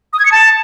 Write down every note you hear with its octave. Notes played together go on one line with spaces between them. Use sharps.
D#6
G#6
C#7
A5